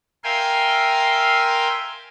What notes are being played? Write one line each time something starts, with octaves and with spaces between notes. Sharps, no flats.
A#4 E5 F5 G5 G#5 C6